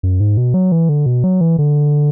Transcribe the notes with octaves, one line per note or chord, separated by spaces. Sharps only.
F#2
G#2
B2
F#3
E3
D3
B2
F#3
E3
D3